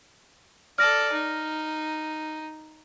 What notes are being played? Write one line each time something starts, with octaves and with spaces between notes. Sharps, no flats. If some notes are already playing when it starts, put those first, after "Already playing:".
A4 D5 F6 A#6
D#4